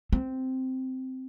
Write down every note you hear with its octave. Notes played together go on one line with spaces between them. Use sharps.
C4